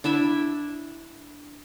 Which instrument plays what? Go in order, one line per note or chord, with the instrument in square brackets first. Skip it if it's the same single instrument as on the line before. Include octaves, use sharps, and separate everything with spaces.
[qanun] D4 E4 E5 B5